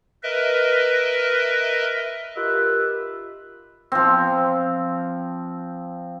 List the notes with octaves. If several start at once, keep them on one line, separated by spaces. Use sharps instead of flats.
A#4 B4 D#5 E5
D#4 F4 G4 A#4 B4 E5
F3 C4